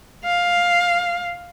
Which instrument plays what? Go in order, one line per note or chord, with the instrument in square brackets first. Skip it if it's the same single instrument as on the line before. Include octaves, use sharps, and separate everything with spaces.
[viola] F5